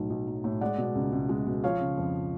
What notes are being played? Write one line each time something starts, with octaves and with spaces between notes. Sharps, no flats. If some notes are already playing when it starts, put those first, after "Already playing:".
Already playing: B1 A2 F#3
B1
F#3
A2
G#3 D5 F#5
B2
C#2
C#2
G#3
B2
F3 C#5 F5
C#3
F2